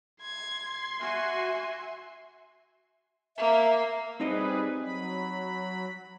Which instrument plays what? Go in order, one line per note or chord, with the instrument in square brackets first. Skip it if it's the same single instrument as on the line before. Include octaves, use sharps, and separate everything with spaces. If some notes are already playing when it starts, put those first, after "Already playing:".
[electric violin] C6 [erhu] G#6
[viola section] F#4 G#5 [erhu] E5
[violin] A#3 [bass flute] E5
[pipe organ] G3 G#4 B4 [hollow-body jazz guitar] C4 D#4 D#5
[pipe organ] F#3 B5